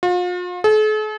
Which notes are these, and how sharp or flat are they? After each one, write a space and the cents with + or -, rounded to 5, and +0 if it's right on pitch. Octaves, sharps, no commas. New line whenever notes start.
F4 +40
A4 -45